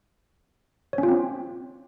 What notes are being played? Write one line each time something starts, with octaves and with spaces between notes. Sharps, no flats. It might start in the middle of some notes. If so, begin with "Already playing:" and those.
C#5
C#4
F4
C4